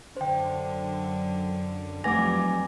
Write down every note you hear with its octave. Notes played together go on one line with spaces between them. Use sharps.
F#2 D3 C5 G5
F2 F#3 G3 A3 B4 G#5 D6 A#6